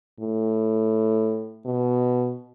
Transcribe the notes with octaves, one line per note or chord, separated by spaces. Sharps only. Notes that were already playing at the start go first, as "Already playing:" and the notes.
A2
B2